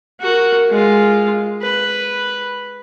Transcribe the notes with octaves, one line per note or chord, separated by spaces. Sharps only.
F#4 A#4
G#3 F4
B4